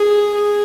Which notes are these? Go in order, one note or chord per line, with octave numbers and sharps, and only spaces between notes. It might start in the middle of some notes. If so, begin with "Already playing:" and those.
Already playing: G#4
G#4